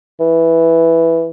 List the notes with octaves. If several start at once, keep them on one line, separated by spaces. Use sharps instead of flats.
E3